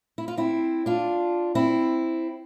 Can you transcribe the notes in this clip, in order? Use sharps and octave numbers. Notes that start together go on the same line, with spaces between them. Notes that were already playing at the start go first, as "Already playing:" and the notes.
E4
F4
C4 E4
D4 F4
C4 E4